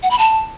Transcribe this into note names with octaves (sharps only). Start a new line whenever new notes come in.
F#5
B5
A5